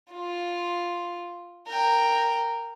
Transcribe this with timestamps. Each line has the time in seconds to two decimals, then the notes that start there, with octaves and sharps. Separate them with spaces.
0.13 F4
1.68 A#4 G5